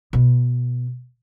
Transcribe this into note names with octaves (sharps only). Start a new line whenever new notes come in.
B2 B3